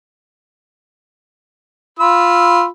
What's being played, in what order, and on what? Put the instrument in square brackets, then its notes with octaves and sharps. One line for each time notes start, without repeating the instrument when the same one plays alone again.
[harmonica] F4 B5 E6